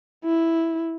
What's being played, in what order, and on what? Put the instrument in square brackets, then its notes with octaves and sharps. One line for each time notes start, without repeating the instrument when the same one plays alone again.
[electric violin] E4